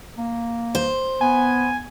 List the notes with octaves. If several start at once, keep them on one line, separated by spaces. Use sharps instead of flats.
A#3
C5
B3 G#5